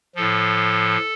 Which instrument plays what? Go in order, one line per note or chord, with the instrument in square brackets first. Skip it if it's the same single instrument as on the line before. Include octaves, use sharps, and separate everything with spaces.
[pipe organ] A2 F3 A4